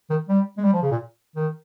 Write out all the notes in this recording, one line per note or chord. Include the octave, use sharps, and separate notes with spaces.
D#3
G3
G#3
G3
F3
C#3
A#2
D#3